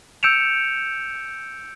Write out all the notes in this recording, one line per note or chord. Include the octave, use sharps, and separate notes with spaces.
E6 G6 C#7 D7 E7 F7